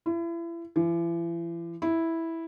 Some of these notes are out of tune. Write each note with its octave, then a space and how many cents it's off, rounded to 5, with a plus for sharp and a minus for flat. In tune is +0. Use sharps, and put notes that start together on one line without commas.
E4 +35
E3 +40
E4 -5